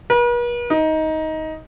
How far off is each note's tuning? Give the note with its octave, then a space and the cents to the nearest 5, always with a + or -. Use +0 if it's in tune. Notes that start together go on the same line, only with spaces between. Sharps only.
B4 -45
D#4 +15